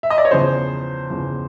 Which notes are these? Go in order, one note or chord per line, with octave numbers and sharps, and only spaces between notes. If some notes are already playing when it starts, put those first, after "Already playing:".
E5
D#5
D5
C#5
E2 C#3 F3 C5
E2 C#3 F3